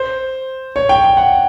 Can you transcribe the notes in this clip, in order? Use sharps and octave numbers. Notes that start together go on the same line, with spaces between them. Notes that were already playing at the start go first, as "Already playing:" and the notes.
Already playing: C5
C#5
G5
G5
F#5